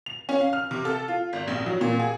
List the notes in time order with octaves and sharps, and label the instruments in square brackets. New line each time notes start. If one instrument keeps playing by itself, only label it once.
[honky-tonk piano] F7
C#4
F5
F6
C3
A4
F4
G#1
A#1
F#3
A#2
G#4